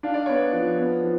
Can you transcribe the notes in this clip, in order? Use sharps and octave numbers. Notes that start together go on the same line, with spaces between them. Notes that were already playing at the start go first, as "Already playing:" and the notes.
D4 F5
D5
B3 C#5
D5
F3
B3
F3